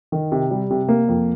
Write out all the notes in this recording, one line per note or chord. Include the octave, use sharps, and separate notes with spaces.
D#3
C3
G3
C3
A#3
F2